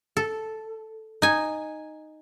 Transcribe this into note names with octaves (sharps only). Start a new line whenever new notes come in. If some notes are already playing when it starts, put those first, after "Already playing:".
A4
D#4 G#5